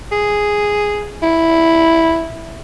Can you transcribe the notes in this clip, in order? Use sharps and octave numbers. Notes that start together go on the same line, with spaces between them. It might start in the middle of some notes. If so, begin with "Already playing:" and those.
G#4
E4